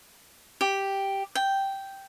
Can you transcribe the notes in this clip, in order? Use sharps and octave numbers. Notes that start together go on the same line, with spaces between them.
G4
G5